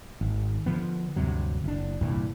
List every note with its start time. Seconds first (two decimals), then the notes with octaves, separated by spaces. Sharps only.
0.21 G#1
0.66 D3 F3 B3
1.16 D2 G2 C3 F#3
1.64 F#1 D4
2.01 C2 G2 A#2 E3